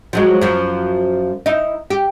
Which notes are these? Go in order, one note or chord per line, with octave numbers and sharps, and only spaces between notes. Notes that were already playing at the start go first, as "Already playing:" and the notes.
F3 F#3 G#3
F#2 F3
D#4 E4
G4